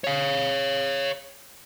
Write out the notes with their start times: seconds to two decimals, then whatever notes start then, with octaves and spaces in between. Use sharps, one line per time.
0.04 C#5 F5